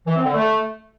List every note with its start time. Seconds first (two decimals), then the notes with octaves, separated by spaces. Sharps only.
0.07 E3
0.16 C4
0.25 D3
0.34 A3